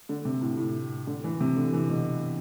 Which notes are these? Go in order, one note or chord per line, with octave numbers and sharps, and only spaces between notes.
D3
C3
A2
A2
D3
E3
C3
D3
E3
B2